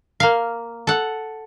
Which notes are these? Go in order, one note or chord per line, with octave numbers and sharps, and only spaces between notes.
A#3 F5
A4 F#5